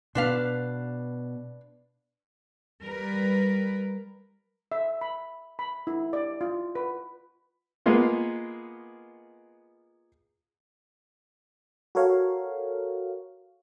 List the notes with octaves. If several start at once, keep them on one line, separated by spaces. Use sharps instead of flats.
B2 B3 D4 B4 F5
G3 A#4 B4
E5
B5
B5
E4
D5
F4
B4
G#3 A#3 B3 F4
F#4 A4 A#4 C#5 F5